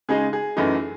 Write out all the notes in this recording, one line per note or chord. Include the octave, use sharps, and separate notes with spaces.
C#3 G#3 D#4 G#4
G#4
F#2 E3 A3 D#4